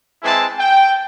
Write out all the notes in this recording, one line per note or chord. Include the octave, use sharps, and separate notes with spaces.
E3 G#3 C4 E4 G#5 A5
G5